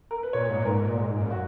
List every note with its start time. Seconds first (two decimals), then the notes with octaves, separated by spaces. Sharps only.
0.11 A#4
0.23 B4
0.33 A#2 C#5
0.49 G#2
0.58 A#2 B4
0.65 G#2 A#4
0.82 A#2
0.98 G#2
1.20 F#2
1.31 F#4